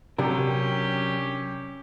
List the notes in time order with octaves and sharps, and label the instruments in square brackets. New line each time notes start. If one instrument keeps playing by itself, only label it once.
[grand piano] C3 [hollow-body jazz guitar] F#3 D4 A#4 [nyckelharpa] C#4 G4